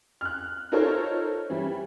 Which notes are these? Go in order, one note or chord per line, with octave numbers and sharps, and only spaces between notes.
F6 F#6
D#4 F4 A4 A#4 C5 C#5
E3 G3